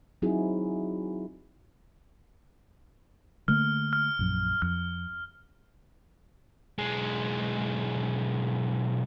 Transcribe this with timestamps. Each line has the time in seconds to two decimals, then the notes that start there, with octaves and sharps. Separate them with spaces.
0.22 F#3 C4 D#4 E4 F#4 G#4
3.48 D3 A3 A#3 F6
3.93 F6
4.19 A#1 F#2
4.62 F2 F6
6.79 B1 G#3